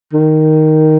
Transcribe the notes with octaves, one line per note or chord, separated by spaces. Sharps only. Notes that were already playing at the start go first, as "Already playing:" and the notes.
D#3